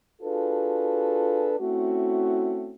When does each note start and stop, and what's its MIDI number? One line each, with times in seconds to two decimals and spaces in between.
0.21 1.54 62
0.21 1.54 65
0.21 1.54 66
0.21 1.54 68
0.21 1.54 69
0.21 1.54 71
1.59 2.73 57
1.59 2.73 60
1.59 2.73 61
1.59 2.73 64
1.59 2.73 66